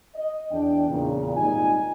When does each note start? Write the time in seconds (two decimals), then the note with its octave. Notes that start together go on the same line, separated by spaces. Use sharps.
0.15 D#5
0.51 E2 D4 G5
0.89 E2 A#2 C#3
1.37 G#1 A#2 G3 D#4 G#5